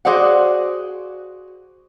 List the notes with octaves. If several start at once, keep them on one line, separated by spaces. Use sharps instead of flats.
F#4 G#4 C5 D5 F5 F#5